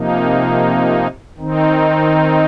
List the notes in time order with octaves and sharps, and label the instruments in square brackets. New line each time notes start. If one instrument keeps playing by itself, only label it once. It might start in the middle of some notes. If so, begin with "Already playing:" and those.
Already playing: [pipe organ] C3 F3 A#3 D#4
D#3 C4 D#4